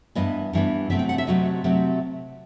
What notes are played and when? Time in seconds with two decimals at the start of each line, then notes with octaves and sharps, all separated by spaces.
0.15 G2 E3 B3 D#5
0.53 G2 E3 B3
0.90 C3 F#3 A3 C4 E5
0.99 G5
1.09 F#5
1.18 E5
1.27 C3 F#3 A3 C4 D#5
1.64 C3 F#3 A3 C4